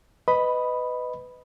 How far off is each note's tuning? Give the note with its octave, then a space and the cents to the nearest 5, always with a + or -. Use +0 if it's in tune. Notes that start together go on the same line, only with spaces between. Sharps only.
B4 +20 D#5 +0 B5 +0